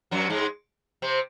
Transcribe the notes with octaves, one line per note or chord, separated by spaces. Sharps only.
F#2 F#3
G#2 G#3
C3 C4